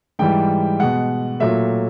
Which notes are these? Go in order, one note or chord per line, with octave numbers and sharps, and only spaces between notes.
G#2 E3 G3 G5
B2 G#3 F#5
A#2 F#3 A3 E5